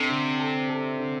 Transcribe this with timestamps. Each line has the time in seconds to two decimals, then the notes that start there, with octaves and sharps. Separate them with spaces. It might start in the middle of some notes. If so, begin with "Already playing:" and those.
Already playing: C3 D4 A4
0.09 D3
0.39 A4
0.70 A4
0.99 D3